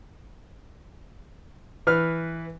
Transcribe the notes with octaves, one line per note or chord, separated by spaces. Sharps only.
E3 B4 F6